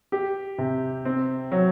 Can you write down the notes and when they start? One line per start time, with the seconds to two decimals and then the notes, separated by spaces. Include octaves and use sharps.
0.12 G4
0.58 C3
1.05 C4
1.52 F#3